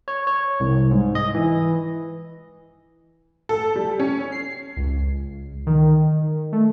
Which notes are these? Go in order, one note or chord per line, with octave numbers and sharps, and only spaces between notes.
C#5
C#5
C2
G#2
D#5
E3
A4
G3
C#4
C7
C#2
D#3
A3